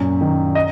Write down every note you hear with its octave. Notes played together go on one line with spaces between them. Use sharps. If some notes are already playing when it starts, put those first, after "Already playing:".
Already playing: F#2 A#2
D#3
D#5